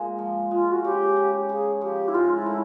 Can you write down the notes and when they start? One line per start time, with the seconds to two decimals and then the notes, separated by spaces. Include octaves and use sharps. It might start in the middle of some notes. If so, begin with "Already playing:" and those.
Already playing: A#2 G#3
0.19 F3
0.51 G#3 F4
0.72 F#4
0.84 C#3 G4
1.17 C#3
1.49 C#3 G#4
1.81 F3 G4
2.08 E4
2.14 G#2 F4
2.36 E4
2.46 A3 E4